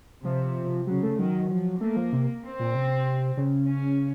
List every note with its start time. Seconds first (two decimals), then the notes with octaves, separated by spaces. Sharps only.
0.24 C3 F3
0.87 C#3 F#3
1.03 A3
1.18 D#3 F#3
1.50 F3
1.81 A3 A#3
1.96 F3
2.13 C3
2.43 C4
2.59 A#2
2.75 C3
3.37 C#3
3.69 C#4